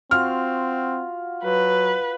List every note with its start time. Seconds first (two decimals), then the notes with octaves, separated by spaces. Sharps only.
0.11 C4 F4 F#4 F6
1.44 F#3 B4